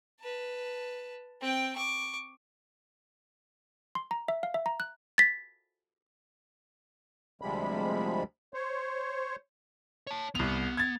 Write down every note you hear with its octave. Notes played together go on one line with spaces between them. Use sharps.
B4 A5
C4 G5
C#6 D6
C6
A#5
E5
F5
E5
A#5
F#6
A6 B6
D2 C3 F3 G3 G#3 B5
C5 C#5
C#5 A5
C2 B3 F7
G#6 A6